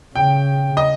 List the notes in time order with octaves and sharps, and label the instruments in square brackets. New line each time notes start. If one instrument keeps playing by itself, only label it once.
[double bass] C#3 [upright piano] G5
[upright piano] D#5